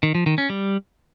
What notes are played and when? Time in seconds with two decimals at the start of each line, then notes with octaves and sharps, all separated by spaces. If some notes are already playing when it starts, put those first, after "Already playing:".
0.03 D#3
0.15 F3
0.26 D#3
0.38 C#4
0.50 G3